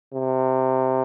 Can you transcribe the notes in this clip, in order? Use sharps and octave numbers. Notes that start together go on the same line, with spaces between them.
C3